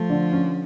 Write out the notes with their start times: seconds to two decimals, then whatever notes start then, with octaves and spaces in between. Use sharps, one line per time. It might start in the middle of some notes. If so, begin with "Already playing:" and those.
Already playing: F3 A3
0.10 D3
0.32 C#4